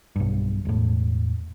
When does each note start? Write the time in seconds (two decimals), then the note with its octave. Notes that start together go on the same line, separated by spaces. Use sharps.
0.16 B1 G2
0.65 E1 A2